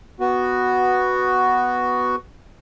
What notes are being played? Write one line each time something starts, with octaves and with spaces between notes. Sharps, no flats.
B3 F#4